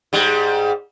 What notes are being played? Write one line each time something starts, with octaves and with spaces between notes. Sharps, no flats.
G#2 G3